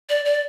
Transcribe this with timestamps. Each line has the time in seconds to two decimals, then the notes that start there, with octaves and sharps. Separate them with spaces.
0.09 D5
0.25 D5